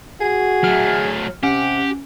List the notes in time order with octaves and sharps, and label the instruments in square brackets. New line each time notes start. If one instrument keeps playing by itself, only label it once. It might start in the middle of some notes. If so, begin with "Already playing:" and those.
[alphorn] F#4 [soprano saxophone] G#4
[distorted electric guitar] F#3 A3 [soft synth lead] F6
[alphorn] C3 [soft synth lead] C#4 [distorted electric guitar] G4 [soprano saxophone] F#5